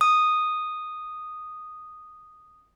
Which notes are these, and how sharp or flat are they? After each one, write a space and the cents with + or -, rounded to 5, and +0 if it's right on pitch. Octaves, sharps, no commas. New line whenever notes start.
D#6 -5